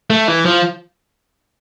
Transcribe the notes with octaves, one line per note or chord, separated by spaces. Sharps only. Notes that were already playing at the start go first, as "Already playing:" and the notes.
A3
E3
F3